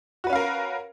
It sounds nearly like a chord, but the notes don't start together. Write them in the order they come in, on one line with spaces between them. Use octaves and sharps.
F#4 B4 C#4 F5 A#4